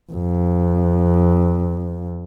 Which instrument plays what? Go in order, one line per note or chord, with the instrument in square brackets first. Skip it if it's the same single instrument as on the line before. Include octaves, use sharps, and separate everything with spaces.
[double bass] F2